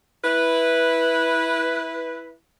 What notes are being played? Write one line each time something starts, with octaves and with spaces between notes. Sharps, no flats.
E4 B4